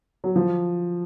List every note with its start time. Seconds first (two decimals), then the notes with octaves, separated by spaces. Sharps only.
0.24 F#3
0.36 F3